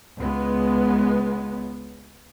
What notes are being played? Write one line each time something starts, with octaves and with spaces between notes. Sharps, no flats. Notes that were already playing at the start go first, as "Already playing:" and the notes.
C#2 G#3 B3